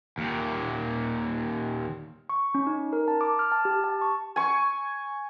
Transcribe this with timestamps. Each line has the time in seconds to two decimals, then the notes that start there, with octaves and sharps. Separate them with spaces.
0.18 D#2 A#2
2.29 C#6
2.55 C#4
2.67 D#4
2.93 A#4
3.08 A5
3.21 D6
3.39 F6
3.52 A5
3.65 G4
3.84 A5
4.02 C#6
4.36 G#5 C#6